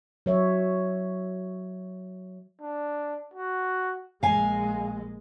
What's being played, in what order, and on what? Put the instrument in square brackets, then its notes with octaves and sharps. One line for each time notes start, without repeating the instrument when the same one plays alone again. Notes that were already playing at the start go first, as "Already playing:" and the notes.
[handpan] F#3 C#5 E5
[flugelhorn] D4
F#4
[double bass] A#1 G#3 [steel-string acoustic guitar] F5 G#5